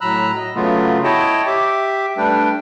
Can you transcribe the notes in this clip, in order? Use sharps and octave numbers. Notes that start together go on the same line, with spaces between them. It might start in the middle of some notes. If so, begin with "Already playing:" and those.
A2 F#3 A#5 B5 E6 F#6
D#5
C#3 F#3 A3 B3 F4
E4 C#5 D#5 G5 A5
G4 E5 D6
G3 A3 D4 B4 G5